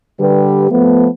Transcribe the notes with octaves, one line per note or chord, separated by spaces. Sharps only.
D3 G3 G4 B4
F3 A3 B3